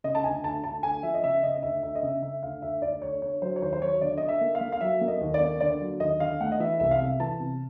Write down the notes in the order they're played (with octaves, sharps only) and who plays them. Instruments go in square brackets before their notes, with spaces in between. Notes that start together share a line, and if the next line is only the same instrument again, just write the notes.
[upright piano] C#3 D#5
A5
D2 G#5
D2 A5
D2 A5
D2 G#5
F3 E5
D#5
C#3 E5
C#3 D#5
D#5
D2 E5
D2 E5
D#5
C#3 E5
C#3 E5
D2 F5
D2 E5
D2 D5
D2 C#5
D3 C#5
F#3 C5
C#5
D#2 C5
C5
F#3 C#5
D3 D5
D3 D#5
E5
A#3
F5
A#3
F5
F#3 E5
A#3
D#5
D#2
D5
A#3
D3 D5
F#3
D#2 D#5
D3 F5
A3 F#5
D#5
E3 E5
C2 E5
F5
C3 E5
E3 A5
C3